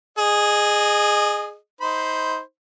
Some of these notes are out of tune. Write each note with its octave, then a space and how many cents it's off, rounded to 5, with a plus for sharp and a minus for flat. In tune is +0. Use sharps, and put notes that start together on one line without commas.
G#4 +0 D#5 -30
D#4 +25 C5 +0 B5 +5